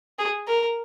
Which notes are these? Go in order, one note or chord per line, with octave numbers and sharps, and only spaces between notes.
G#4
A#4